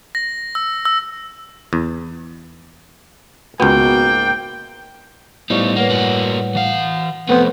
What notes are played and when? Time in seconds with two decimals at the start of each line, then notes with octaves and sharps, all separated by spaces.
0.15 A#6
0.55 E6
0.85 E6
1.73 E2
3.60 C#2 G#2 B2 A#3 B3 G5
5.50 A2 G3 B3 D#4 C5 F5 C#6
5.76 A#3 B4 C#5 F#5
5.90 A#3 F#4
6.55 E3 F5 F#5
7.29 F3 A3 B3 C4 A4 B4 C5